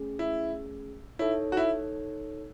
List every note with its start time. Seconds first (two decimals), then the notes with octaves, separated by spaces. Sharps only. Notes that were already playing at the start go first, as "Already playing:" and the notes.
Already playing: A3 C#4 G#4
0.19 E4
1.19 D#4 E4 A4 C#5
1.52 F#4
1.57 E4